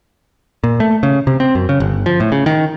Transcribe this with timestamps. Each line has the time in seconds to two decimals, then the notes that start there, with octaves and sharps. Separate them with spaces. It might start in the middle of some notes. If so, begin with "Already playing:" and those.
0.64 A#2
0.80 A3
1.03 C#3
1.27 C3
1.40 C4
1.55 F#2
1.69 C#3
1.80 G1
2.06 F3
2.20 A2
2.32 C#3
2.46 D#3